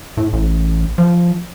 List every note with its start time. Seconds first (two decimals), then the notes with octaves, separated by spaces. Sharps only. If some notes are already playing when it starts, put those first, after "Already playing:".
0.17 A2
0.33 A1
0.98 F3